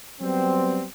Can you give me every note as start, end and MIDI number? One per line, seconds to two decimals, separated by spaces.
0.21 0.85 54
0.21 0.85 55
0.21 0.85 59
0.21 0.85 60